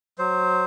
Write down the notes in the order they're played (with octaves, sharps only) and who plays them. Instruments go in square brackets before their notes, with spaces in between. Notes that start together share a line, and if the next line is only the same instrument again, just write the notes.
[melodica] F#3 C5